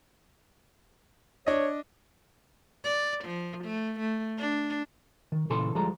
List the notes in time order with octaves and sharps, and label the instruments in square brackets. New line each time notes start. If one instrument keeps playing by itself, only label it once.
[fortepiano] D4 D#5 [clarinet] C#5
[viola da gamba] D5
F3
A3
A3
D4
[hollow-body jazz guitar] D#3
A#2 C#3 E3 A4 C6
D2 F3 G3 G#3 A4 A#5